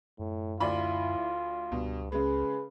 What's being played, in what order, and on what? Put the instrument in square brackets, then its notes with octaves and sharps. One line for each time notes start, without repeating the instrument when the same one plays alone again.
[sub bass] F#2 [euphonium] A2
[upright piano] D2 D5 B5 [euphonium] E4 [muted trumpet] F4
[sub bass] C#2 [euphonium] G2 [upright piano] B2
[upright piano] C#3 G#3 [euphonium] G#4 [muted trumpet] B4